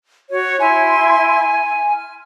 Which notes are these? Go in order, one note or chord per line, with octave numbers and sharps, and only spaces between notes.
F#4 C#5
E4 E5 G#5 C6
F6